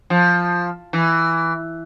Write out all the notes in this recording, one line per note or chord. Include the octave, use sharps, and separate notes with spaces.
F3
E3